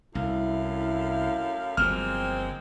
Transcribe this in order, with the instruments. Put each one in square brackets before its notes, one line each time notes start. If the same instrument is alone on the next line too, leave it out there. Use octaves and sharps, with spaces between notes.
[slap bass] C2 [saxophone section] F#2 A3 F5 [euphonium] E4
[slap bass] G1 F3 F#3 [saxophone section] G#3 A#3 C4 [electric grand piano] F6